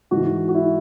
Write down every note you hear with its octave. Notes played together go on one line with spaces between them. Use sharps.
G#2 E3 F#4
F#4
E4